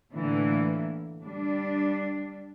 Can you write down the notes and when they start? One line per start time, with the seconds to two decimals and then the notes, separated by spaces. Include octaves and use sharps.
0.13 A2 D3 E3 A#3 E4
1.23 G3 D4